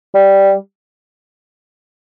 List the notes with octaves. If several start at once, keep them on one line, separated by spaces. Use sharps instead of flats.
G3